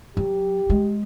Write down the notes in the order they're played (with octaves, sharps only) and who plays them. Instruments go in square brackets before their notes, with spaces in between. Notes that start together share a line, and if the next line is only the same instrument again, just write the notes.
[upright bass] F#3 [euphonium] G4
[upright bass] G#3